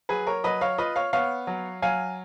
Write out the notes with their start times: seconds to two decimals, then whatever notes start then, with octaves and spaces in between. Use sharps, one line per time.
0.09 F#3 G#4 B4
0.27 A#4 C#5
0.44 F#3 B4 D#5
0.61 C#5 F5
0.78 F4 B4 D#5
0.96 C#5 F5
1.13 B3 C#5 F5
1.47 F#3
1.82 F#3 F5 G#5